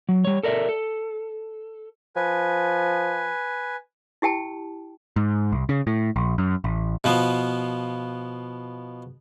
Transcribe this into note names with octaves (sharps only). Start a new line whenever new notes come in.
F#3
G3 C#5
A4 A#4 D5 E5
A4
F3 B4 G#5
E4 G4 G5 A5
G#2
C2
C#3
A2
A#1
F#2
A1
B2 F3 B3